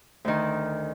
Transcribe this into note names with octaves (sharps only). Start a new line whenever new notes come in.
D2 D#3